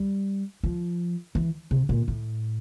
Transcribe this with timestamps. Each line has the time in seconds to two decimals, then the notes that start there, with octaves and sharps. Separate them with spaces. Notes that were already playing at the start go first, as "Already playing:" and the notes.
Already playing: G3
0.63 F3
1.35 E3
1.71 C3
1.89 A#2
2.08 A2